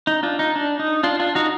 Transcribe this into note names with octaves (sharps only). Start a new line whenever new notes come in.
D#4
D4 F4
D#4
D4
D#4
D4 F4
D4 F4
D#4 F#4